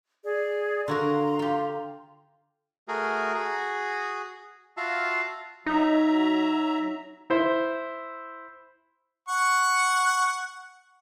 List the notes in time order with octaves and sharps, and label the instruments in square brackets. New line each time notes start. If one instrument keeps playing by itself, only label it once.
[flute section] G#4 D5
[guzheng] D3 F#4 A#4 [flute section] F5 A#5 C6
[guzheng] F4 G4
[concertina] A3 F#4 G#4 A#4
F#4 G#4
F4 F#4 E5 F5 A5
[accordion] F#3 E5 A#5 [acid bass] D#4
[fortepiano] E4 C5 E5
[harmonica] F#5 C#6